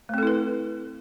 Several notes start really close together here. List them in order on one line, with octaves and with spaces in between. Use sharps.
A3 C4 A4 E4 B4